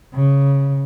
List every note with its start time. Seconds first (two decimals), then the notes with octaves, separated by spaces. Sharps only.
0.14 C#3